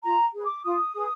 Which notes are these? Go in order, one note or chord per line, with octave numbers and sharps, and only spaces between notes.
F4 A#5
G#4 B4
D6
F4 D#6
G#4 B4